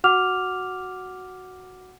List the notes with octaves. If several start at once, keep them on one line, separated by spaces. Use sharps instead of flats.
F#4 F#5 D6 F6 F7